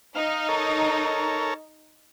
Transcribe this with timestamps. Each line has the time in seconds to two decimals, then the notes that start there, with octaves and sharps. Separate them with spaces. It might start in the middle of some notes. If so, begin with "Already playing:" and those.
0.15 D#4 F5
0.49 A4 A#4 C#5